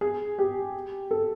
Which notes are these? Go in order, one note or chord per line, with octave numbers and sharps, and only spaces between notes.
G#4
G4
A4